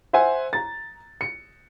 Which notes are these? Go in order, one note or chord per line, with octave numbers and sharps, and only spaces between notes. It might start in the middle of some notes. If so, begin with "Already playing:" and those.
C5 E5 F#5 G#5
A#5 A6
C#7